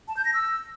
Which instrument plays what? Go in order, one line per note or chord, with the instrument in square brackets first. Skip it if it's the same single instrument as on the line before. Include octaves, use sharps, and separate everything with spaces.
[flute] A5
G6
A#6
E6